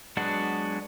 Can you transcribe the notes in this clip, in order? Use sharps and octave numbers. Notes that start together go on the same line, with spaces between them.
F#3 G#3 B3 D4 F#4